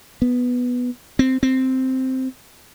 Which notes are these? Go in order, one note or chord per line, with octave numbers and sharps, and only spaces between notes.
B3
C4
C4